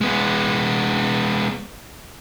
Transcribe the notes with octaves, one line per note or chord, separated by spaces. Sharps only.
G#3 B3